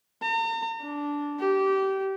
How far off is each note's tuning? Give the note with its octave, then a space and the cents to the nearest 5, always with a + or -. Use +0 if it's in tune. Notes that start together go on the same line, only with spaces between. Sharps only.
A#5 -40
D4 -10
G4 -25